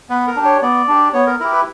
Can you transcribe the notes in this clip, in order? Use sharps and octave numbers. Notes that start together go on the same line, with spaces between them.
B3 B4
A#4
D4 G4
C#5
B3 D5
D4 G4
B3 C#5
A#4
E4 G4 A#4
B4